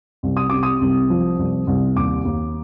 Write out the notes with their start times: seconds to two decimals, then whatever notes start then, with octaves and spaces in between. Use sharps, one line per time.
0.23 C2
0.37 D#6
0.50 C3 D6
0.63 D#6
0.81 C2
1.10 F3
1.39 C2
1.67 C2
1.96 D#2 D6
2.25 D#2